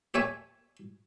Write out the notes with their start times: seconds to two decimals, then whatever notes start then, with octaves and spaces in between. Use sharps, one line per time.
0.14 G4 A4 C#5 E5 G#5